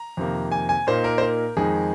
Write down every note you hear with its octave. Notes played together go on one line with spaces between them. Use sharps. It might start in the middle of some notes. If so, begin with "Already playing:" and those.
Already playing: A#5
F2 C3 D#3 A#3
G#5
G#5
A#2 A#3 D#4 C5
A#4
C5
A#4
F2 D#3 G#3 D#4 G#4